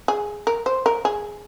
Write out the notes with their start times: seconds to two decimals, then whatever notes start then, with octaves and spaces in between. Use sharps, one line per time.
0.08 G#4
0.47 A#4
0.66 C5
0.86 A#4
1.05 G#4